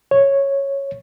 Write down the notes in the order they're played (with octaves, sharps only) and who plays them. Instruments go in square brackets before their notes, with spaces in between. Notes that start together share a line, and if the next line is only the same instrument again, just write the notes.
[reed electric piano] C#5